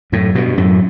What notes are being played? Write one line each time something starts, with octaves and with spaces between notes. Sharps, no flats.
F#2 A2
G2 B2
F#2 A2